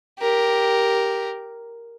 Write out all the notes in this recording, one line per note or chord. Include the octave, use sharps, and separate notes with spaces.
G4 A#4